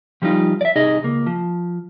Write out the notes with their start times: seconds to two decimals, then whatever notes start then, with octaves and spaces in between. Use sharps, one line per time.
0.22 F3 G3 B3 D#4 F4
0.61 D5 E5
0.76 C2 D#4 G#4 D#5
1.03 C#2 A#3
1.27 F3